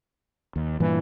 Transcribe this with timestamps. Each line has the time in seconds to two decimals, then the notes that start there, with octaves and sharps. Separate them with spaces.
0.56 D#2
0.80 G2 A#2 E3